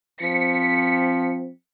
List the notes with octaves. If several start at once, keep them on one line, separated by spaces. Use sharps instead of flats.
F3 C4 B6 C#7